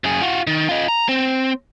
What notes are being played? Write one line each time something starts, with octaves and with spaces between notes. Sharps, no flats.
F#2 G#4
F4 F#4
D#3
F4 D#5
A#5
C4